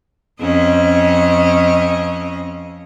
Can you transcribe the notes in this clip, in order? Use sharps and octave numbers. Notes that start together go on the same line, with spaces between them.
F2 C#4 D#5